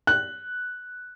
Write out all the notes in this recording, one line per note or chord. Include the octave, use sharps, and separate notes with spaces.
F#6